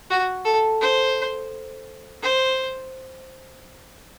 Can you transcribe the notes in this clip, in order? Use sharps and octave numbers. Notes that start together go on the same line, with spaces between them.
F#4
A4
C5
C5